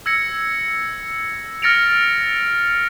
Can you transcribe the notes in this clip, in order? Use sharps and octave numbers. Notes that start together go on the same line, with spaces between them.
E6 G#6 A#6 C#7
F6 A6 A#6 C#7 D7 F7